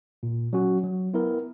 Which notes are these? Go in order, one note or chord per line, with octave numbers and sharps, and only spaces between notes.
A#2
F#3 C#4 F#4
F#3
B3 E4 A#4